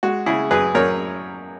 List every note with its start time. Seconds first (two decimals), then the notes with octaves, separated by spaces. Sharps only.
0.03 G#3 F#4
0.26 C#3 E4 G#4
0.51 F#2 G#4 B4
0.75 F#2 A#4 C#5